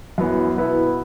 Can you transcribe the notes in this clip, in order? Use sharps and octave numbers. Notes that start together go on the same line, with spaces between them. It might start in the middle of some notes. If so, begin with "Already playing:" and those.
F#2 E3 B3
B2 B3 E4 B4